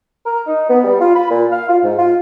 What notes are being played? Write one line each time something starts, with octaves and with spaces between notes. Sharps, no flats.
A#4
D#4
B3
G3
F4
B5
A#2
F5
F4
G#2
F4